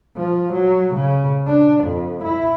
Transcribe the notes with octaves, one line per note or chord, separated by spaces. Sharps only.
F3
F#3
C#3
D4
F2
E4